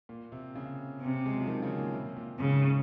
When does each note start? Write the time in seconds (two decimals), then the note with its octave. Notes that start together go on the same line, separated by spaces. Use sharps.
0.09 A#2
0.32 C3
0.55 C#3
1.01 C3
1.26 G#3
1.33 F#3
1.40 F3
1.47 D#3
1.62 C#3
1.78 A#2
1.93 C3
2.17 A#2
2.39 G#2 C#3